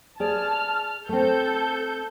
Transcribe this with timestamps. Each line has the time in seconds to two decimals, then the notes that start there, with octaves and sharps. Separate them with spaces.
0.20 G#4 D5 A5 F6
1.09 A3 C4 A4 G6